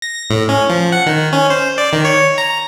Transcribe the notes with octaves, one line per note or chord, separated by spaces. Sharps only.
A#6
A2
C#4
F3
F#5
D#3
C#4
C5
D5
D#3
C#5
A#5